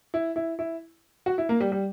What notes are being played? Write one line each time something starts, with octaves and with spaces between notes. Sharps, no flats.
E4
E4
E4
F#4
E4
A#3
G3
G3